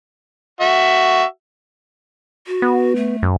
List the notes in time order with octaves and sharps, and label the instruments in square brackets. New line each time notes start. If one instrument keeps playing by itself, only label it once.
[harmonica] F#4 E5
[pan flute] F#4
[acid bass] B3
[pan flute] A3
[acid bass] F#2